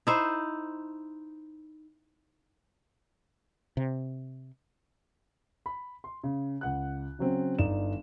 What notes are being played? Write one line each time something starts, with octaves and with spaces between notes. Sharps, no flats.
D#4 E4 C5
C3
B5
C6
C#3
C#2 F#5 F#6
C#3 F#3 C4 C#4
G1 D#4 D5 E7